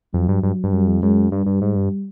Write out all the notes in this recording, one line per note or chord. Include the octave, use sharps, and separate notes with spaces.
F2 F#3
G2
G2
G2
F#2 G3
F2
F#2 G#3
G2 G3
G2
G#2
G2